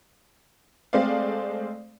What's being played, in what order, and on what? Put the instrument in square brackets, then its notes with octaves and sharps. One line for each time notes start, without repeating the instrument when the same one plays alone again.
[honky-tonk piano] G#3 A3 C4 C5 D5 F5